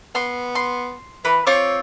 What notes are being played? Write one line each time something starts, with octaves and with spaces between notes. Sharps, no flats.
B3 C6
C6
E3 B4
C4 F4 C#5 D6